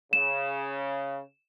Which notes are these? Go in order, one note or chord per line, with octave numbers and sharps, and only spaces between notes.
C#3 E7